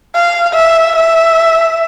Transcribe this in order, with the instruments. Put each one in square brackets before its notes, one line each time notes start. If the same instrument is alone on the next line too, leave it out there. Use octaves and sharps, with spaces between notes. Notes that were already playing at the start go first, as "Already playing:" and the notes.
[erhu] F5
E5
E5